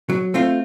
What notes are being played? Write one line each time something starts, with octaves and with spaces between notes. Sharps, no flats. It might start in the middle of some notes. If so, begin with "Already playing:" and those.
F#3
A3 C4 F4